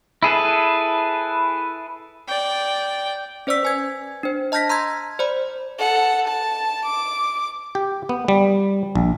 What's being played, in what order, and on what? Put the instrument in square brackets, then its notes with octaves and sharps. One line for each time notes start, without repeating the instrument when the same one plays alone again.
[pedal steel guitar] E4 G#4 A4 B4
[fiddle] D5 G5
[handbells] C#4 C5 D5 C#6 E6 B6
B4 G#5 G#6
D4 C5
D#5 A5 F6 G6 A#6 B6
A#5 C6 E6 G#6
C5 D5 B5
[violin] A4 F#5
A5
D6
[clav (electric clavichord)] G4
B3
G3
A#1